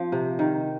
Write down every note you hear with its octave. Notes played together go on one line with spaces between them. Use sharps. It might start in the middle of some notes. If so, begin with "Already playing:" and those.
Already playing: F3 C4
C3
D#3